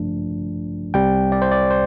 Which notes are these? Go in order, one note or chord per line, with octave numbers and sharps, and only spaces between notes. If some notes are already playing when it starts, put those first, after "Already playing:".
Already playing: A1 G2 F3 A3 D4
C2 C3 G3 C4 G5
D5
C5
D5
C5